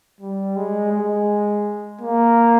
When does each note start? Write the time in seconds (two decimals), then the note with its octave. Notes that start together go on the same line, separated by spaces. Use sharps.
0.20 G3
0.56 G#3
0.92 G#3
2.01 A#3